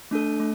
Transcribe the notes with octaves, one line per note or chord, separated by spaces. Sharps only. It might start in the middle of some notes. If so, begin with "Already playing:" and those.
A3 D4 A4
A3